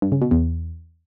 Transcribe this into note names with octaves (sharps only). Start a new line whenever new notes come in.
G2
C#3
B2
E2